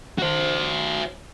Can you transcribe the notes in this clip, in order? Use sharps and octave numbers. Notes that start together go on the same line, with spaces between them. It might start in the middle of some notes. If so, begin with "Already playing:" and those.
F#4 C5